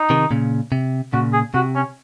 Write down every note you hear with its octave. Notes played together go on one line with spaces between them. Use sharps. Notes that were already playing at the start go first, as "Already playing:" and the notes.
Already playing: D#4
C3 D#3
A#2 C#3
C3
A#2 C#3 F#4
G#4
C3 F#4
C#4